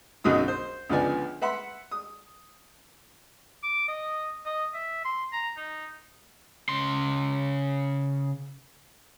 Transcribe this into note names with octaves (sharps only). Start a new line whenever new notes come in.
B1 F#2 D3 F#3 D#4 D#6
C5
C#2 D3 F3 B3 D5 G#5
B4 E5 F#5 B5 C6
D#6
D6
D#5
D#5
E5
C6
A#5
D#4
C#3 C6